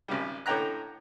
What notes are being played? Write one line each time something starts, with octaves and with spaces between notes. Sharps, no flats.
G#1 C#3 G3
A2 D3 C#4 G5 A#5 F#6